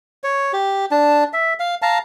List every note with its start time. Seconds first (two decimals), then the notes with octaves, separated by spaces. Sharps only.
0.24 C#5
0.53 G4
0.91 D4 A5
1.33 E5
1.60 F5
1.82 F5 A5 A#5